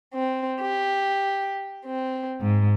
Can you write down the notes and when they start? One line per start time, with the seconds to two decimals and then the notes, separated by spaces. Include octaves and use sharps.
0.13 C4
0.59 G4
1.85 C4
2.40 G#2